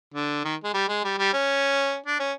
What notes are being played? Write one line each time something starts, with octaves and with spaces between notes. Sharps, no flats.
D3
D#3
G#3
G3
G#3
G3
G3
C#4
D4
C#4